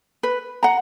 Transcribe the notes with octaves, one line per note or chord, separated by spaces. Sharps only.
B4
F#5 A#5